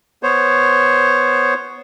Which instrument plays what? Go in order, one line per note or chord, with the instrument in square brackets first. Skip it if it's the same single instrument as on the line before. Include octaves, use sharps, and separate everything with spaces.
[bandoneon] B3 C5 C#5